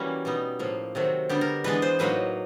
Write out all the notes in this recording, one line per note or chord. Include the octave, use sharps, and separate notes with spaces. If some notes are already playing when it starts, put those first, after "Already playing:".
Already playing: E3 G3 A#3 C#4 F#4
B2 G3 B3 D#4
A2 F3 A#3
C3 D#3 F#3 A3 C4
D3 G3 B3 D4 G4
A#4
E3 G#3 B3 D4 B4
C5
A2 F#3 A#3 D#4 B4